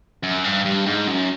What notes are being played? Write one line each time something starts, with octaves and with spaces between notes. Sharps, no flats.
F#2
G2
G2
G#2
F#2